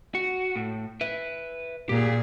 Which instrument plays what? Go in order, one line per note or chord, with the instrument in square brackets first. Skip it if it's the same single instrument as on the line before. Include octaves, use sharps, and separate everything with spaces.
[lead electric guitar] F#4
A2
B4 E5
[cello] A#2 G#4 [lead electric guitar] G4